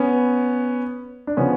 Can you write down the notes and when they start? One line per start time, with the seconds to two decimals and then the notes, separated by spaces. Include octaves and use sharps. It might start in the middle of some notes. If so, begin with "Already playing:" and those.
Already playing: B3 C#4
1.27 D4
1.37 C#3 F3 B3 C#4